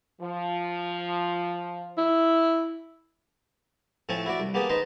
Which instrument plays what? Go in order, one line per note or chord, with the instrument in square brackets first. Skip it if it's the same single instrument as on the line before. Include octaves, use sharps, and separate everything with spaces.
[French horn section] F3
[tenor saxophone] E4
[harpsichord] A2 F3 C4 C#5 G#5 A5
E4 F#4 D5
C2
A#3 B3 G4 G#4 A5 D#6
D#4 B4 C5 D#5 A5